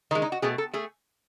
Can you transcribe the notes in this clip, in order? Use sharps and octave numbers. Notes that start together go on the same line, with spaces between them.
D#3 G#3 D#4
D#4
F#4
B2 A3 G#4
A4
A3 G#4